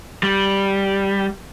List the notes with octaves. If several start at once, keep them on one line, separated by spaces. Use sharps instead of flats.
G3